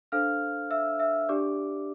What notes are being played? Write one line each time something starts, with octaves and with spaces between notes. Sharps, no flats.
D4 A4 C5 F5 F6
E5 E6
E5 E6
D4 G4 D5 D6